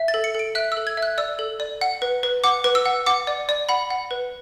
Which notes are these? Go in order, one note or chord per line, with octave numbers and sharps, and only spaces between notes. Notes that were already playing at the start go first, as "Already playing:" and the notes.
Already playing: E5
A6
A4
C#7
A4 D7
E5 F#6
E6
A4
G#6
E5
F#6
D5 E6
A4
D5
F#5
B4
B4
F#5 D6
B4
E6
F#5
F#5 D6
D5
D5
F#5 B5
F#5
B4